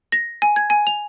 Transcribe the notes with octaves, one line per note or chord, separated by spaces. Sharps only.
A#6
G#5
G#6
G#5
F7